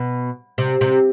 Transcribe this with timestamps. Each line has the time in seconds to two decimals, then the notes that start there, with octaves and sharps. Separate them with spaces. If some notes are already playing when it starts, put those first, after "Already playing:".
Already playing: B2
0.58 C3
0.81 C3